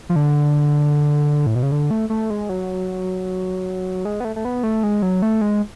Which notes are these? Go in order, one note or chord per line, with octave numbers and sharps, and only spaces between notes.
F3
D3
A2
B2
C#3
D3
A3
A3
G#3
F#3
G#3
B3
A3
A3
B3
A3
G#3
F#3
A3
G#3